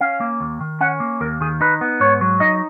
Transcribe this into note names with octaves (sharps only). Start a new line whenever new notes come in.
C#4 F5
A#3
D#2
D#3
C#4 F#5
A#3
D#2 A#4
D#3 G#4
D#4 B4
B3
G#2 C#5
F#3
D#4 D#5